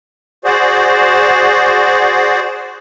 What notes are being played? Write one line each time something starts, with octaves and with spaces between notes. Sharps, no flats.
F#4 G#4 C5 D5